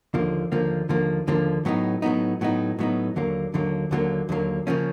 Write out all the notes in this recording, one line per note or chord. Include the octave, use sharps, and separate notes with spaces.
D#2 D3 F3 A#3
D#2 D3 F3 A#3
D#2 D3 F3 A#3
D#2 D3 F3 A#3
A2 F#3 B3 D#4
A2 F#3 B3 D#4
A2 F#3 B3 D#4
A2 F#3 B3 D#4
D#2 D3 F#3 A#3
D#2 D3 F#3 A#3
D#2 D3 F#3 A#3
D#2 D3 F#3 A#3
C#3 F3 A#3 C#4